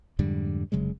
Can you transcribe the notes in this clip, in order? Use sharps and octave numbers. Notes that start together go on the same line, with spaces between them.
F2 G#2 D3 G3
F1 C#3 F#3 G#3